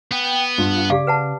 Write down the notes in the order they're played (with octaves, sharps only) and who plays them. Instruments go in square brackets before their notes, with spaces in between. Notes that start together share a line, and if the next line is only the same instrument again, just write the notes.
[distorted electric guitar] B3 [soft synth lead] G5
[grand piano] G2 [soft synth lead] F4
[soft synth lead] C#3 [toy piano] G4 D5 F5 [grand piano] D6
[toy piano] B4 F#5 A5